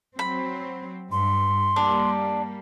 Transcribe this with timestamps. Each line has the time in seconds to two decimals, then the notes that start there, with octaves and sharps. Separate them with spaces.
0.19 F#3 C4 B5
1.12 G2 C6
1.76 G3 A#3 D4